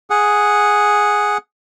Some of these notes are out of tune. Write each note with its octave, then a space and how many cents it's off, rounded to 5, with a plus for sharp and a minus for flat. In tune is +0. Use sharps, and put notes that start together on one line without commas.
G#4 +0 F#5 -5